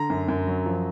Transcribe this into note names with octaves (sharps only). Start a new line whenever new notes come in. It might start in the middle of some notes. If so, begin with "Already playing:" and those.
Already playing: D3 A#5
F#2
F#2
F#3
F3